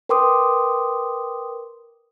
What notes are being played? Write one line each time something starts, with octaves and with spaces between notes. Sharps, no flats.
A#4 B4 G5 C6 D6 D#6